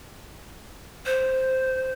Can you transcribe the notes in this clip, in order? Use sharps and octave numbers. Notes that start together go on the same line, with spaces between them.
C5